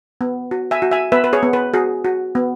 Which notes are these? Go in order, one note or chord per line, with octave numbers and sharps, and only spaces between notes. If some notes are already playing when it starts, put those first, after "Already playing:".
B3
F#4
E5 G#5
F#4
E5 G#5
B3 B4 E5
B4
G#4 C#5
B3
B4
F#4 G#4
F#4
B3